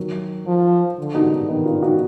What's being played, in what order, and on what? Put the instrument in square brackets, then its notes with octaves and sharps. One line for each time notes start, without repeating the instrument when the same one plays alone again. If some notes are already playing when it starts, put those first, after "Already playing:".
Already playing: [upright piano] D#3 F#3
[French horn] F3
D3
[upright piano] D#4 F#4
[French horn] D#3 [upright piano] B3 D#4
[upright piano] D4 F4
D#4 F#4